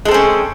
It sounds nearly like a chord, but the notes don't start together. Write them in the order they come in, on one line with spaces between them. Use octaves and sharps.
G#3 A4 C4 C#4